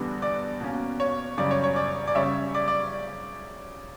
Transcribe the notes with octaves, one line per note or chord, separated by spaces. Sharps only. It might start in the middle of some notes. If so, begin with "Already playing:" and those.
Already playing: E2 D3 G3 B3 D4
D5
B2 A#3 C#4
C#5
F#2 C#3 G3 C#4 D5
C#5
C#5
D5
D5
C#3 G3 C#4 C#5 E5
D5
D5